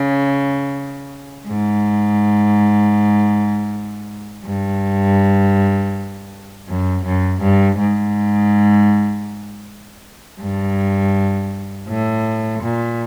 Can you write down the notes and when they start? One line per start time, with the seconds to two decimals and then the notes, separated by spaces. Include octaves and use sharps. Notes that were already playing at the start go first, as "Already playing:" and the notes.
Already playing: C#3
1.48 G#2
4.45 G2
6.68 F#2
7.05 F#2
7.42 G2
7.79 G#2
10.40 G2
11.88 A2
12.63 A#2